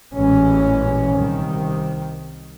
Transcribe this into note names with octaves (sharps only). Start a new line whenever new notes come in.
A1 A#2 E3 G#3 C#4
C2 D#3